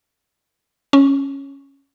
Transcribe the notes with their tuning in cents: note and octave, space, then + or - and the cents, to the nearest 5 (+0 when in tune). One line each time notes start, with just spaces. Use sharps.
C#4 -5